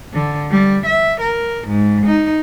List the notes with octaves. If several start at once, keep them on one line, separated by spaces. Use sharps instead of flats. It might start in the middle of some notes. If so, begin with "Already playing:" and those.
D3
G3
E5
A#4
G#2
D#4